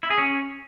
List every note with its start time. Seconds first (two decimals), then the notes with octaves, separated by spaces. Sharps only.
0.03 E4
0.10 G#4
0.18 C#4